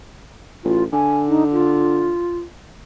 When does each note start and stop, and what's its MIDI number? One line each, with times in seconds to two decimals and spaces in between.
0.64 0.86 33
0.64 0.84 65
0.93 2.14 50
0.93 1.18 80
1.28 1.44 63
1.52 2.38 65